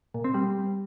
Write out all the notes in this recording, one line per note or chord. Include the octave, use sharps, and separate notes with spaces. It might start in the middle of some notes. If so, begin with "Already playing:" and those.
A#2
C4
G3